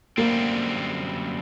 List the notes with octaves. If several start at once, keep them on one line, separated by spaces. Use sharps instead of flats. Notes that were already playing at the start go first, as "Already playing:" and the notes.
F#2 D3 G3 A#3 C4